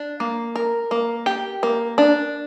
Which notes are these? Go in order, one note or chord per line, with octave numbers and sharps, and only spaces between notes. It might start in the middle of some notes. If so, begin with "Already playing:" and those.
Already playing: D4
A#3
A#4
A#3
G4
A#3
D4